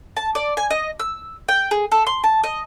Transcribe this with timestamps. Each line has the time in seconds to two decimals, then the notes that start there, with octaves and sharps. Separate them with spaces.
0.17 A5
0.35 D5
0.57 G#5
0.70 D#5
0.99 E6
1.49 G5
1.71 G#4
1.92 A4
2.07 C6
2.24 A5
2.44 D#5